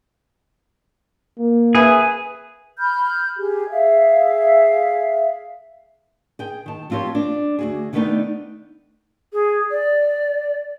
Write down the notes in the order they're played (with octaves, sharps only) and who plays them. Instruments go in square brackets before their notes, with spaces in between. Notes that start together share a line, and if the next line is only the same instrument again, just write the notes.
[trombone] A#3
[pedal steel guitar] G#4 [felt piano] B4 E5 G#5
[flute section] B5 F6 G6
G4 G#4
G#4 E5 F5
[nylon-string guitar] G#4 G5
D#3 A5
F3 C4 F4 G4 C#5
D4
D2 F#4 G#4
D3 D#3 A3 B3 D4 D#4
[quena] G#4
D5